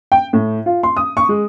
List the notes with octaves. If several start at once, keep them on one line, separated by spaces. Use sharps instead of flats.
G5
A2
F4
C6
D#6
C#6
G#3